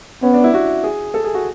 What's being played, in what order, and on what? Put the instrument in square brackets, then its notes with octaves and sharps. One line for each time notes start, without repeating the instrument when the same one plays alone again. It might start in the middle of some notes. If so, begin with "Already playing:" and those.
[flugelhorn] B3 [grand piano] C#4
[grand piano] D4
E4
F#4
G#4
A4
G#4
F#4